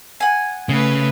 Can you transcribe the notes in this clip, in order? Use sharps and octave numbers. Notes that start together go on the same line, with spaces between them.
F#5 G#5
C#3 A3 B4